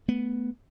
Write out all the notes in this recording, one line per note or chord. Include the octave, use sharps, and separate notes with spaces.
A3 B3